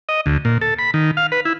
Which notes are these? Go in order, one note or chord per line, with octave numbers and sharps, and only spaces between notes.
D#5
D2
A#2
A4
B5
D#3
F5
B4
E4